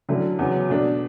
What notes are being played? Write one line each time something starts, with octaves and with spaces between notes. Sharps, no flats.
D3 F#3 A3 C#4 E4
E2 C#3 F#3
B2 A3 D4